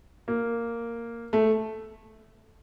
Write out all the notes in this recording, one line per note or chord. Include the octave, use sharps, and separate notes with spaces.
A#3
A3